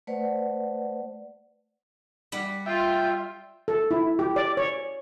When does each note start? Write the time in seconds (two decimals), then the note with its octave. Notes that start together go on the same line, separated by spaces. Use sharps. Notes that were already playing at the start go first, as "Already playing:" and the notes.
0.07 A3 B4 C5 D5 F#5
2.32 G3 F#5
2.66 F4 E5 G5
3.68 A4
3.91 E4
4.19 G4
4.36 D5
4.57 C#5